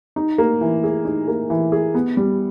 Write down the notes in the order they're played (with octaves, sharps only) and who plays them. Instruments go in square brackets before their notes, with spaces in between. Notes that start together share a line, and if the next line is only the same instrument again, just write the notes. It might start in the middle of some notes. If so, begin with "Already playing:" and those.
[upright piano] D#4
A#3
E3
G#4
D#4
A#3
E3
G#4
B3
G3